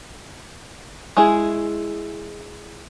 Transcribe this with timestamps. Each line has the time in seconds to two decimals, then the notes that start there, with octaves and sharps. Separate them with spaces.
1.17 G#3 E4 G#4